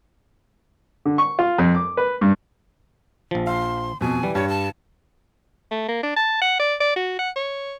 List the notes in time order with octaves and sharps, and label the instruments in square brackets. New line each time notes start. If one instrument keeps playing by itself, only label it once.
[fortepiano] D3
C#6
F4
F2
D6
B4
G2
[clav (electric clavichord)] A#1 F3
[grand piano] F5 [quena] C6
[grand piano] F2 B2 [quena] G#5
[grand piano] E3 [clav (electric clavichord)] G3
[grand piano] G2 [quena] C#5
[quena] A5
[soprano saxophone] A3
A#3
D4
A5
F#5
D5
D5
F#4
F#5
C#5